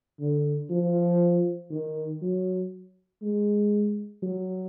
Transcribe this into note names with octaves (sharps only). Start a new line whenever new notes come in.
D3
F3
D#3
F#3
G#3
F#3